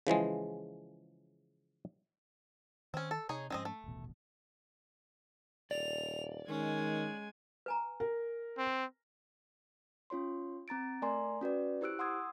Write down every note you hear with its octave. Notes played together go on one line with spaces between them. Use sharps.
C#3 E3 F3 G#3
D#3 C4 C#4
A4
C3 D#4 G#4 C#5
G#2 F3 G#3 C4 C#4 D#5
A3
D#1 A1 B2
D#1 D5 F7
D#3 G#3 C#4 G#5
B4 G#5 A#5
A#4
C4
C#4 F4 C#5 C6
C4 A#5 A6 D7
A3 A#4 D5 G#5 A#5 C6
C#4 F#4 B4 D5
E4 G4 C5 E6 F#6 D7
F#5 C6 D#6 E6 G#6